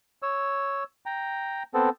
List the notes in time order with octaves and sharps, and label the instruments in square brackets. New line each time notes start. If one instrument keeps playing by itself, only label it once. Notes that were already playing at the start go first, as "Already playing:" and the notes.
[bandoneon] C#5 E6
G5 A#5
B3 C4 A4